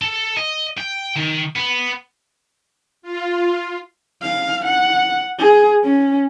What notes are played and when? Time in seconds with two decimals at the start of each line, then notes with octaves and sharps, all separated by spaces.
0.02 A4
0.37 D#5
0.78 G5
1.17 D#3
1.56 B3
3.02 F4
4.22 F5
4.65 F#5
5.39 G#4
5.84 C#4